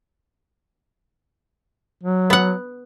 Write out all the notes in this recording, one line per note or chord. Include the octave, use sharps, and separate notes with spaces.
F#3
B3 F#5